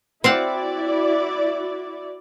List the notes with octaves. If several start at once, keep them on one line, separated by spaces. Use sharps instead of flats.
C4 E4 F#4 D5 F5 F#5